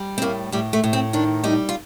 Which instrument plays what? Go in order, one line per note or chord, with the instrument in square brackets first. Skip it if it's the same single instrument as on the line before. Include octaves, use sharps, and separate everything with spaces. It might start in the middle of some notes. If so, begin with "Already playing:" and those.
Already playing: [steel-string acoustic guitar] G3
C4
A2 A#3
A2 G3
A3
A2
C4
D#3 D4
G3 D#4
F4